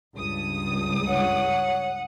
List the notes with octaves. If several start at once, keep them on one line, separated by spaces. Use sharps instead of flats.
C#2 G2 D#6
C#5 F#5